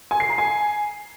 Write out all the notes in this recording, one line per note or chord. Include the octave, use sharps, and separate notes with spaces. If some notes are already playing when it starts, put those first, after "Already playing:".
G#5
C7
A#5
G#5